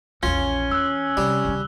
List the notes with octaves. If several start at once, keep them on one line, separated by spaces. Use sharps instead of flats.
A#1 E2 C#4 F4 G7
E2 E6 F#6
C3 G3
D#2 C#3